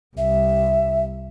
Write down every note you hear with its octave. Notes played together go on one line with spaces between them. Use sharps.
C2 E5